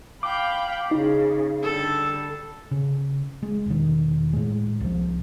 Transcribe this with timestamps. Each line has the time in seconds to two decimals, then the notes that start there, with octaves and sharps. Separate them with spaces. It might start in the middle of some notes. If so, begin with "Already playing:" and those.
0.23 F5 G5 B5 D6
0.91 C#3 D#4
1.63 D3 G3 A4
2.71 C#3
3.43 G#3
3.66 E1 D#3
4.33 A2 G#3
4.80 C2 F3